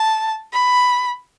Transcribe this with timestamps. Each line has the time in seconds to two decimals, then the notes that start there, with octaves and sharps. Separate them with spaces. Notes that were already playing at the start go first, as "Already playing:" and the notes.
Already playing: A5
0.53 B5